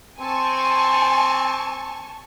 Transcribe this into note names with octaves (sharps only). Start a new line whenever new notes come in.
C4 G#5 A5 C#6